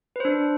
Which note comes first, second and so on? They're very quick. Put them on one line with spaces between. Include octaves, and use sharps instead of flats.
B4 C5 D4